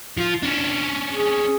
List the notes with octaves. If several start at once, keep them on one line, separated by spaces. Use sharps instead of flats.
F3 F4
C#4 D4
G#4